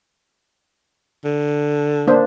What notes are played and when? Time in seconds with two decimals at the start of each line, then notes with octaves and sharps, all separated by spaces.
1.25 D3
2.07 A#3 D4 C5